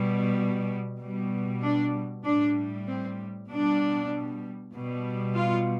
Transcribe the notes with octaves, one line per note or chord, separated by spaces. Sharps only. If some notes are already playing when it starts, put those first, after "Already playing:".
Already playing: B2 G3
B2 G3
D4
A2 G3 D4
C4
B2 G3 D4
B2 G3
F4